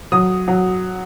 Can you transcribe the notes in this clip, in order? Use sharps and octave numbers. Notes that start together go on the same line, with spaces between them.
F#3 D#6
F#3